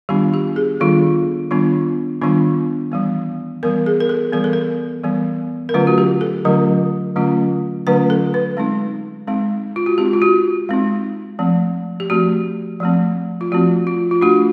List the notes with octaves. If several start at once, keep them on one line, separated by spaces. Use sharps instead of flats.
D#3 G3 B3 D4 F4 G4
G4
G#4
D#3 G3 B3 D4 F4 A4
D#3 G3 B3 D4 F4
D#3 G3 B3 D4 F4
E3 G3 B3
E3 G3 B3 A#4
G#4
A#4
A4
E3 G3 B3 A#4
A4
A#4
E3 G3 B3
A#4
D3 F#3 A3 C#4 F4 B4
F#4
G4
A4
D3 F#3 A3 C#4 F4 A#4
D3 F#3 A3 C#4 F4
D3 F#3 A3 C#4 F4 B4
A4
B4
G#3 C4 D#4
G#3 C4 D#4
F4
F#4
G#3 C4 D#4 G4
F4
F#4
G#3 C4 D#4
F3 A3 C4
G4
F3 A3 C4 F#4
F3 A3 C4
F4
F3 A3 C4 F#4
F4
F4
A3 D4 F4 F#4